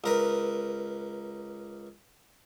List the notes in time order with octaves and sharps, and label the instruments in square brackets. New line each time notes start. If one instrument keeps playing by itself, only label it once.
[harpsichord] C#2 A#4 B4